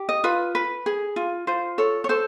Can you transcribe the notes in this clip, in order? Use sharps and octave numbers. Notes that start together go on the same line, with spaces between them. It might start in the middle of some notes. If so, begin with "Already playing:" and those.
Already playing: G4
D#5
F4 B4
B4
G#4
F4
F4 C5
A4 C#5
C#5
A4 C5